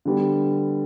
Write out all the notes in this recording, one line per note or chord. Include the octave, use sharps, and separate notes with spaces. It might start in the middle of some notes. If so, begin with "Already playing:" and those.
D3 G3 B3